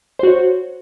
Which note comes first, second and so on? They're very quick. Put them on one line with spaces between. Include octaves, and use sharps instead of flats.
C5 F#4 C#5